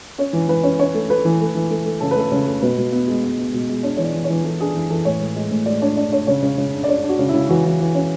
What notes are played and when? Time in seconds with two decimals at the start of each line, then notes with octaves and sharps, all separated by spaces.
0.18 C#4 C#5
0.33 E3
0.48 E3 B4
0.63 C#4
0.79 C#4 C#5
0.94 A3
1.09 A3 B4
1.25 E3
1.40 A3
1.55 E3
1.70 A3
1.85 A3
2.00 C#3 A4
2.11 B4
2.16 A3 A4
2.32 C#3
2.47 A3
2.62 B2 B4
2.77 B2
2.92 B3
3.08 G#3
3.23 B3
3.38 B3
3.53 B2
3.69 G#3
3.83 D4 C#5
3.97 E3 C#5
4.04 D5
4.14 E3
4.24 C#5
4.29 E3
4.44 E3 A4
4.60 D4 G#4
4.74 E3
4.90 E3 A4
5.05 A2 C#5
5.21 A2
5.36 G#3
5.51 A2
5.66 G#3 D5
5.82 D4 C#5
5.97 D4 D5
6.12 D4 C#5
6.27 C#3 C#5
6.43 C#3
6.58 C#3
6.73 D4
6.84 D5
6.88 D4 C#5
7.04 D4
7.09 F#4
7.19 C#3
7.29 C#3 E4
7.49 E3 F#4
7.65 E3
7.80 E3
7.95 C#4